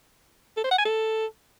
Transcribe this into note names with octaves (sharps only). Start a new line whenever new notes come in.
A4
C5
F#5
G#5
A4